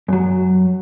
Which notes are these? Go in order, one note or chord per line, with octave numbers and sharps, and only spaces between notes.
F#2 F#3